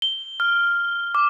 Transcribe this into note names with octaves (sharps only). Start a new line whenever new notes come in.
G7
F6
D6